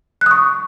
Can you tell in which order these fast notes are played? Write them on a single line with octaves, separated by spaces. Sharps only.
F#6 D#6 C#6